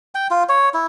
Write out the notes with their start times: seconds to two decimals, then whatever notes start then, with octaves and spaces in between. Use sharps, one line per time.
0.15 G5
0.31 F4
0.49 C#5
0.74 E4